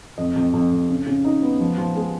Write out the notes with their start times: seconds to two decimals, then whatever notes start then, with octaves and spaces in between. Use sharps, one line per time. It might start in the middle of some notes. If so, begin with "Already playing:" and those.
0.18 F2 D#5
0.36 F2
0.54 F2
0.71 F2
0.89 C#3
1.07 C#3
1.25 D#4
1.42 B3
1.60 F3
1.78 F3
1.96 G#3